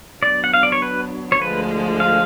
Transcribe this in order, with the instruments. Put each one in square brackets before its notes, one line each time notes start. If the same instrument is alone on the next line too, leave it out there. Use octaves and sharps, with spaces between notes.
[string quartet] F#3 B3 D4 [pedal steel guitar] D5
[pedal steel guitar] F#5
F5
D5
C#5
B4
C#5
[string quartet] D2 D3 F3 G#3 [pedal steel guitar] B4
[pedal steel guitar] F5